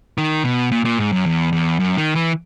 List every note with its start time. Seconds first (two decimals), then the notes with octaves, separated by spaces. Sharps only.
0.18 D#3
0.44 B2
0.72 A#2
0.85 A#2
0.99 G#2
1.12 F#2
1.26 E2
1.53 E2
1.80 F#2
1.97 D#3
2.15 E3